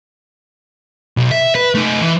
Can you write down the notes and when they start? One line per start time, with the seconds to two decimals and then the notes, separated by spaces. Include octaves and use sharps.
1.17 B1
1.31 E5
1.55 B4
1.75 A3 D#4
2.01 E3